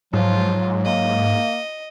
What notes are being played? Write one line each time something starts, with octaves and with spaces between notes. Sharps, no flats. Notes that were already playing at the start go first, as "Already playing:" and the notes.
G#2 F3 F#3 F4
A#3 D#5